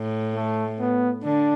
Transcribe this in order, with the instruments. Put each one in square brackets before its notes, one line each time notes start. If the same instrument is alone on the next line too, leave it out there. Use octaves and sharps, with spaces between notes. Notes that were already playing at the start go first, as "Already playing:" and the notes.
Already playing: [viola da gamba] A2
[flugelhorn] A3
B3
[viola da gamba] D3 [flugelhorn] D4